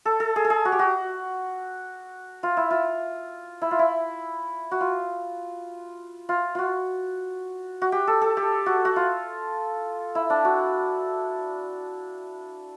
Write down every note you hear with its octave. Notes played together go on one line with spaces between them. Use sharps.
A4
A4
G#4
A4
G#4
F#4
G4
F#4
F4
E4
F4
E4
F4
E4
F#4
F4
F4
F4 F#4
F#4
G4
A4
A4
G4
F#4
F#4
F4
E4
D4
F#4